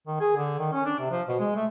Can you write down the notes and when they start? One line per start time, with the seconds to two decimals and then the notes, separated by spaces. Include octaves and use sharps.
0.07 D#3
0.20 G#4
0.37 D3
0.59 D#3
0.73 C#4
0.85 D4
0.99 C3
1.11 F3
1.28 B2
1.40 G#3
1.56 A3